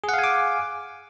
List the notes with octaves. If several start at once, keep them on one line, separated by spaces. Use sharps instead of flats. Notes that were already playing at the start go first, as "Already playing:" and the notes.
G#4 F5 F#5 G#5 D6